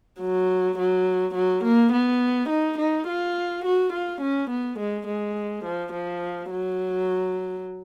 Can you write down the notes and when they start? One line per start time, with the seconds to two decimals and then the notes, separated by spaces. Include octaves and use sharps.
0.20 F#3
0.79 F#3
1.35 F#3
1.64 A#3
1.92 B3
2.49 D#4
2.78 D#4
3.07 F4
3.65 F#4
3.93 F4
4.21 C#4
4.50 B3
4.79 G#3
5.07 G#3
5.65 F3
5.93 F3
6.51 F#3